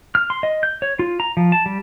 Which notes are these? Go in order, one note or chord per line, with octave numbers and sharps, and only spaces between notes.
F6
C6
D#5
G6
C#5
F4
A#5
F3
A5
G3